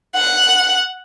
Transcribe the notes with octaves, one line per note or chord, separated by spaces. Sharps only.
F#5